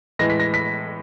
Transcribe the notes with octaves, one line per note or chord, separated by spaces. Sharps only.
A2 E3 G#3 A#6
B6
A#6
B6